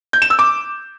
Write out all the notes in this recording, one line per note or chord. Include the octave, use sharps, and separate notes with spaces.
G6
E7
E6
D6